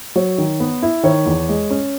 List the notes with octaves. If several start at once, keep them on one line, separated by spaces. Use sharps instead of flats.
F#3 C#5
D#3
B3
E4
D#3 C#5
E2
G#3
C#4